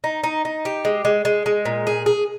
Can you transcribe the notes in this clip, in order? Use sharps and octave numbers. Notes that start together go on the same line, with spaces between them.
D#4
D#4
D#4
G4
G#3
G#3
G#3
G#3
A#2
G#4
G#4